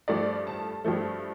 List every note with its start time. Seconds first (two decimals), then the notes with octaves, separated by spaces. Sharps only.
0.08 G2 F3 A3 D5
0.47 A5
0.84 G2 F3 A3